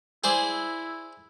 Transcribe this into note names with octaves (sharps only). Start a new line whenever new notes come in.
E4 G#4 C5 D5